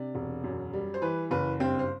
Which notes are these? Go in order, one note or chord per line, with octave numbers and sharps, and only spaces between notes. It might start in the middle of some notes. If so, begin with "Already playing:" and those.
Already playing: C3 D4 D5
E1
F#2
G3
C5
E3 B4
F#1 B4
G2 C4 C5
C5